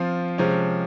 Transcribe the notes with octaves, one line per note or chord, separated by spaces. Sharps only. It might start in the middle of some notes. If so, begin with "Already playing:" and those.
Already playing: F3 C4 F4
C3 F3 G#3 C#4